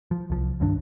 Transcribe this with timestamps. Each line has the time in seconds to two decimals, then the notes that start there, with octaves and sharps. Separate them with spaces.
0.11 F3
0.30 C2 F3
0.60 C#2 G2 D#3 D4